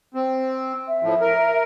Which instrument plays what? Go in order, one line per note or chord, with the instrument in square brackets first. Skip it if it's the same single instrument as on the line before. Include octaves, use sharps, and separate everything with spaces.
[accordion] C4
[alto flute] E5
[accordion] A2 F3
A#4